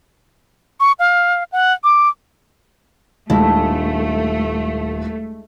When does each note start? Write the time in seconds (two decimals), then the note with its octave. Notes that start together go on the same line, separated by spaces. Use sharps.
0.80 C#6
0.99 F5
1.52 F#5
1.84 D6
3.30 D#1 G#3 A3 D4 E4